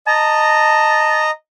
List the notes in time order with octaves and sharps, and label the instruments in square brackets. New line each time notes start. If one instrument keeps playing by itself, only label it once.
[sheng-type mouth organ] D#5 A#5 [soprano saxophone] A5